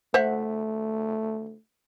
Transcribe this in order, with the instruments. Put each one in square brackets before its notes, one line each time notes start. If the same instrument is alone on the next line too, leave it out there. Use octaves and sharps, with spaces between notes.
[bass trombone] A3 [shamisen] C5 E5 F#5